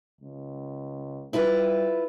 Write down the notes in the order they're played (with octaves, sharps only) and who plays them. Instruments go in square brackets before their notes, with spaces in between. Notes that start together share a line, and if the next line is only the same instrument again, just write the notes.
[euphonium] C#2
[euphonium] G3 [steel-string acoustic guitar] E4 F4 B4